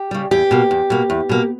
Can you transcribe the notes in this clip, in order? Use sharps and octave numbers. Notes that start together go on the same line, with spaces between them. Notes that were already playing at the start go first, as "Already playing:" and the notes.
Already playing: G4
C#3 G3
E2 G4
B2 A#3
E2
B2 A#3
E2
B2 A#3